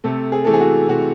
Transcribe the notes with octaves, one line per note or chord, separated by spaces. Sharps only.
C3 A3 A4
G#4
E3 A3 A4
G#4
F#4
C3 F#4